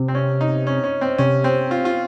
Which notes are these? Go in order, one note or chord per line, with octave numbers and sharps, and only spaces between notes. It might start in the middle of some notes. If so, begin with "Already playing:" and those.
Already playing: C3
C4
C#4
D#4
C#4
C#4
C4
C3 C#4
C4
F4
F4